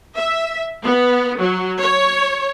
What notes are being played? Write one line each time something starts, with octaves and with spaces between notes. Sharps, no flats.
E5
B3
F#3
C#5